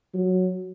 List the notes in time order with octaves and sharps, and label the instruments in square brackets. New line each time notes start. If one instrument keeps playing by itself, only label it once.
[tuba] F#3